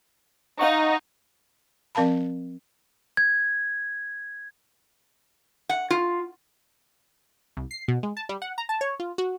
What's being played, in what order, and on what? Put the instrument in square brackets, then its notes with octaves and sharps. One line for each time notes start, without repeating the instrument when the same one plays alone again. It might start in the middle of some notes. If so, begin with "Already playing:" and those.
[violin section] D#4 [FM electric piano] F5 F#5 C#6
[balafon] F3 C4 A#4 F5 A5 B5
[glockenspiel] G#6
[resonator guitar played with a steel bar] F#5
F4
[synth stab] C2
C7
B2
G#3
A5
G3
F#5
A#5
A5
C#5
F4
F#4